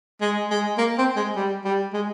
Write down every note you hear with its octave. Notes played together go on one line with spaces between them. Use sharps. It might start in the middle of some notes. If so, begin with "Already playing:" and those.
G#3
G#3
A#3
C4
G#3
G3
G3
G#3